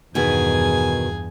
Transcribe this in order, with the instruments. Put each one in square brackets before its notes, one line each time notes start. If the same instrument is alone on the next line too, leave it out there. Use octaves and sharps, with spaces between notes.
[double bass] E2 G2 [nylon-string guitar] B2 D#3 B3 [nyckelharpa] G#4 G#5